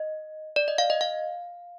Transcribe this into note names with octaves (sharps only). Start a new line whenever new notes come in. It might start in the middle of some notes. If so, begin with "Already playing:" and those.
Already playing: D#5
D5
D#5
F5
D#5
F5